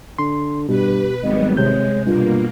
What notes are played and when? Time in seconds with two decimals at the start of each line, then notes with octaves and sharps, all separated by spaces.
0.19 D3 C6
0.69 G2 B2 G4 B4
1.23 G#1 F#3 G3 B3 D#5
1.57 C3 G#3 C#5 G6
2.06 G2 B2 A#3 F4